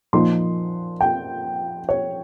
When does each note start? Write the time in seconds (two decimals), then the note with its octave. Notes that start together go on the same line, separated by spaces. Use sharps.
0.13 A#2 F3 A#3 D#4 C6
1.01 G5
1.89 C#5